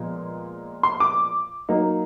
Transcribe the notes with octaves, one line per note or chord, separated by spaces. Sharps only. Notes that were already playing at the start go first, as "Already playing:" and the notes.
Already playing: A#2 F3 G#3 B3
C6
D6
F#3 A#3 D#4